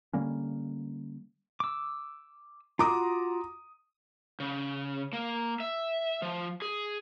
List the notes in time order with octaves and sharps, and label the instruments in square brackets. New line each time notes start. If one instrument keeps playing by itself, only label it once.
[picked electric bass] D3 G3 A#3 C#4
[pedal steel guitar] D6 E6
[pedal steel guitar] F4 F#4 [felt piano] A#5 D6 D#6
[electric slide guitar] C#3
A#3
E5
F3
G#4